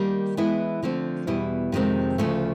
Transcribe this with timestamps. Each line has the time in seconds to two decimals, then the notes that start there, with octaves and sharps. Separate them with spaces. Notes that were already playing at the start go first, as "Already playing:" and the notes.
Already playing: D#3 G3 A#3
0.37 E3 G#3 B3 E4
0.83 D3 F3 A3 C4
1.27 E2 B2 G3 B3 E4
1.72 F2 C3 D#3 G#3 C4
2.18 D2 C#3 F3 A3